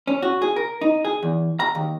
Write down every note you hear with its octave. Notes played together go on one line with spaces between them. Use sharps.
C#4
F#4
G#4
A#4
D#4
G#4
E2
A#5
D#2